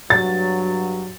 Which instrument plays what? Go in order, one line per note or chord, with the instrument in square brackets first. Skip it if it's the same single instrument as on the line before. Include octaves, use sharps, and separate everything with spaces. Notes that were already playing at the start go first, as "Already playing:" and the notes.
[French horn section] G2 F#3 [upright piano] A6